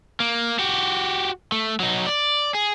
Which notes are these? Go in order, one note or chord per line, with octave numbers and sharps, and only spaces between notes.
A#3
F#4 G4
A3
F#3 D#4
D5
G#4